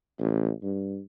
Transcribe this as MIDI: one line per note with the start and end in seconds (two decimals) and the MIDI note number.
0.19 0.50 33
0.63 1.00 43